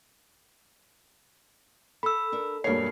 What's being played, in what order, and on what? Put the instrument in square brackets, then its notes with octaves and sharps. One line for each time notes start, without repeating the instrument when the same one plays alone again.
[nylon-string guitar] A4 [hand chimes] B5 E6
[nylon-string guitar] D4 A4 A#4
[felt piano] E1 G2 C#5 [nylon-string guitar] A3 A#3 [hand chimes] C7